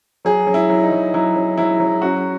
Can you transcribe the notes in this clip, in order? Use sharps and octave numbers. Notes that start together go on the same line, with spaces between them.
F#3 G#4
F#3
E4
F#3
D#4
F#3
F#3 E4
F#3
F#3 E4
F#3
F#2 F#4